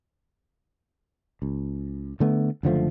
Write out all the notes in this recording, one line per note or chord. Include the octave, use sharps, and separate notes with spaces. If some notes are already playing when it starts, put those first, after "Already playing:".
C#2
D3 A3 B3
F#1 D3 F3 A3